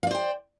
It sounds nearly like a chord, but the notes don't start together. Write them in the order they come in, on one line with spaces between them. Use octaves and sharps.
F5 D5 C5 G5